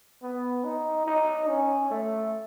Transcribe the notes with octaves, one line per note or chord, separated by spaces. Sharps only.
B3
D#4
D#4
C#4
A3